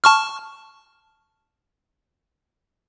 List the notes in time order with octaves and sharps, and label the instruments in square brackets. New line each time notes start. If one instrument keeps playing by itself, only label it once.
[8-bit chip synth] A5 C#6 F6